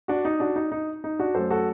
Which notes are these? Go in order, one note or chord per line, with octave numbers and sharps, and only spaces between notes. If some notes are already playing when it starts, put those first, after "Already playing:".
D4 F#4
D#4
D4 F#4
D#4
D#4
D#4
D4 F#4
F#2 F#3 A3 A4 C5
F#4 A4